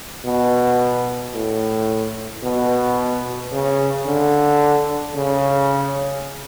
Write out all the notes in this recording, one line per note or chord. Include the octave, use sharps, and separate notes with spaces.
B2
A2
B2
C#3
D3
C#3